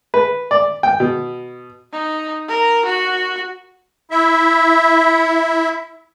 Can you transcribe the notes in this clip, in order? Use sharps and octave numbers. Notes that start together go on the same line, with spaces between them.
B4
D5
G5
B2
D#4
A#4
F#4
E4 E5